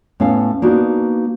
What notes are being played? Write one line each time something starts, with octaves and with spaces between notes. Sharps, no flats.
A2 B3 C#4 F5
A#3 B3 D4 D#4 F#4